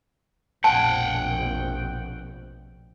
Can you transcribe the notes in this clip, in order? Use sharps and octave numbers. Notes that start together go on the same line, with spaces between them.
F1 A#1 B2 F#5 G5 A5